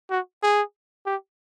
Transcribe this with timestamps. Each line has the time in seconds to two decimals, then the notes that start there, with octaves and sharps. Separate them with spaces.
0.11 F#4
0.43 G#4
1.06 G4